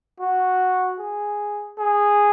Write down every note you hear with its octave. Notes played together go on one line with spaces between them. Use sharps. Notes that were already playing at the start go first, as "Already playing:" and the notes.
F#4
G#4
G#4